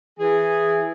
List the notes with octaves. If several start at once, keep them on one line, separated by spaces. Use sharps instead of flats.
E3 G#4